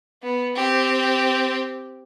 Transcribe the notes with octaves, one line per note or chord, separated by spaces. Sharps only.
B3
C4 G4